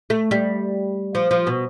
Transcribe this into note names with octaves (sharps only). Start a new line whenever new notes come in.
A3
G3
F3
F3
B2